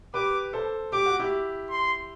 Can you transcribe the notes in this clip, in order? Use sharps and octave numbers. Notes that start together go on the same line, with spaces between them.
G4 B4 D6
A4 C5
G4 D6
F#4
E4 G4
C6